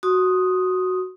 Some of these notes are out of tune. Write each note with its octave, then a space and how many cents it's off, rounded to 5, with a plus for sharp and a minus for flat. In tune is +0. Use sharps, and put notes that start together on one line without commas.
F#4 +0 C6 +30 D#6 +0